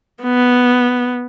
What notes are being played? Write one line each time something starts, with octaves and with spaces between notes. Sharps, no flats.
B3